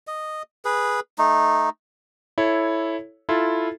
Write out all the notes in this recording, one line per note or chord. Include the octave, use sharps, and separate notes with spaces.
D#5
G#4 B4
A3 D#4
E4 A4 C#5
E4 F4 A4